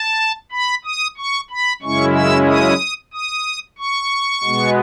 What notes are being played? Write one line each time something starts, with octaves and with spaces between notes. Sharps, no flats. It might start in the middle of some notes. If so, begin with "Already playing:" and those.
Already playing: A5
B5
D#6
C#6
B5
F#2 C#3 G#3 C#4 E4 C#6
E6
D#6
D#6
C#6
B2 G#3 B3